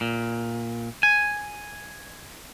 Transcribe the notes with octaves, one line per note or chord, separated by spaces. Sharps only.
A#2
G#5